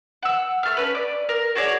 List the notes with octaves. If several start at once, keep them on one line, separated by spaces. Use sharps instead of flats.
F#5 E6
A3 F6
C#4 B4
D5
A#4
F#4 G#4 C#5 D5